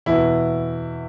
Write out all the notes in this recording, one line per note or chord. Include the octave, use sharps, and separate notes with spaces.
E2 B2 E4